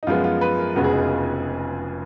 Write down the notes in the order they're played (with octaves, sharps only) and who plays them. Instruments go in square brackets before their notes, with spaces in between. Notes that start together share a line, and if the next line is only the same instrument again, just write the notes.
[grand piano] D#4
F#2 F3 G#3 B3 F4
F4
B4
A#4
F1 F2 C#3 G#3 B3 F#4
G#4
D#4
F4